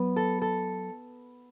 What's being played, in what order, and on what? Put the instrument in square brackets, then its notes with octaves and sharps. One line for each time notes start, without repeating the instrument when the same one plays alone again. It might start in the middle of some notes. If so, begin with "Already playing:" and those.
Already playing: [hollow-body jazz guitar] F#3 [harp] B3 B4
[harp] A4
A4